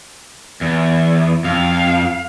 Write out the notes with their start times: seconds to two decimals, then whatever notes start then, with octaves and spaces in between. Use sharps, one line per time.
0.61 E2
1.44 F2 F5